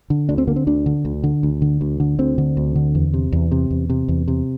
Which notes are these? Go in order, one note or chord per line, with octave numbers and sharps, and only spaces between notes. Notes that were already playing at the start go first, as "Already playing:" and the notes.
D3
D2 D4
C4
D3 A#3
C4
D2 D4
D3
D2
D3
D2
D3
D2
D3
D2 C4
D3
D2
D3
E2
C3
E2
C3
E2
C3
E2
C3